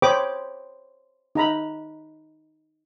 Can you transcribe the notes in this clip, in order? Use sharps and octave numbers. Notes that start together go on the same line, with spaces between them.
C5 C#5 G5 B5 D6 D#6
D#4 A#5 B5